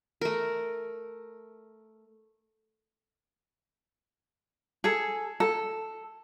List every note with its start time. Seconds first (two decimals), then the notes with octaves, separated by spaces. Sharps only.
0.21 A3 A#4
4.84 G#4 A4
5.40 A4